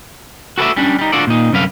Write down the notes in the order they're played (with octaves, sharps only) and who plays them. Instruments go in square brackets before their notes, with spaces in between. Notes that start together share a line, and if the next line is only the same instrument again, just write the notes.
[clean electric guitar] F#4 A4 B4 C5 D5 E5
G3 C#4 D4
G3 D#4
D4 F4 F#4 A4 D5
A#2 D#4
C2 F#2 D3 B4 F5